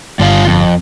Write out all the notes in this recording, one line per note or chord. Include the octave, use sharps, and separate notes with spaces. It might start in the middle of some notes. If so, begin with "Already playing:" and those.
G1 G3 F4 F5
F2